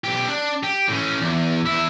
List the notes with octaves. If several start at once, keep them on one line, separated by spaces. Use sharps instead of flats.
B1 G4
D4
G4
A2 C#4
E2
E2 E4